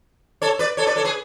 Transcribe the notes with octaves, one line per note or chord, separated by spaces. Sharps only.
A4 C#5
B4 D5
A4 C#5
B4 D5
A4 C#5
G#4 B4